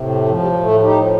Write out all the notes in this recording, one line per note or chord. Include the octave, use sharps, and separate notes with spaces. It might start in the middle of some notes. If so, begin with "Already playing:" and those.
Already playing: A2 C3
A3
F3
G3
G3
A2 A3
D#4 G4
F3